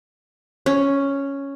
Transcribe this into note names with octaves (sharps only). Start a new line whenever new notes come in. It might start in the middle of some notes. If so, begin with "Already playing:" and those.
C#4